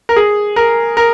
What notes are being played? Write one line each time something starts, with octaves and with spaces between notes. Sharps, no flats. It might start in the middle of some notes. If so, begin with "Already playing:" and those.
A#4
G#4
A#4
A#4